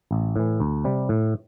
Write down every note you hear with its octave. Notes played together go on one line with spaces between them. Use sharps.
A1
A2 E3
D2
C3 G3
A2